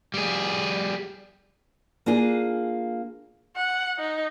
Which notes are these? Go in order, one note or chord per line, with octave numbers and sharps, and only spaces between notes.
G3 G#4
A#3 D4 F4 G#4
F#5
D#4